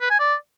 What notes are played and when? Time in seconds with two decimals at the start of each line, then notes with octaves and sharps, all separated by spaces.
0.01 B4
0.10 G#5
0.19 D5